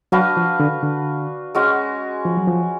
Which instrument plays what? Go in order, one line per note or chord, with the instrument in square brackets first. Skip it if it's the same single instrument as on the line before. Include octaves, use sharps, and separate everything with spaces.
[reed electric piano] F#3 [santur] D4 F#4 B4 F5
[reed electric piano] F3
D3
D3
[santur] G#3 C#4 F#4
[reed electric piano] F3
F#3
F3